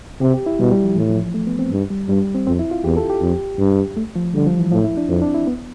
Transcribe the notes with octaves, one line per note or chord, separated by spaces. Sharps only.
C3 G4
G4
E4
B2 G3
G3
F3
A2 E3
F3
A3
B3
C4
G2
G3
G2 G3
C4
F2 C4
E4
F4
E2 G4
A4
G4
F2
G2
A3
F3
D3 G3
F3
E3
A2 F3
E4
D4
F2 C4
D4
E4
B3